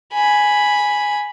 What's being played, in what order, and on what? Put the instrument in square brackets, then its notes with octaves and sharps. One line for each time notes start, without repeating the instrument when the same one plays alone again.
[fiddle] G#5 B5